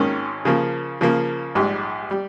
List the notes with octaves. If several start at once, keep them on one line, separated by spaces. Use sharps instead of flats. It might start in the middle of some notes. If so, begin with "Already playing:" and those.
Already playing: G#1 G#2 D#3 A#3 C#4
C#3 F3 A#3
C#3 F3 A#3
A#1 G#2 G3
G3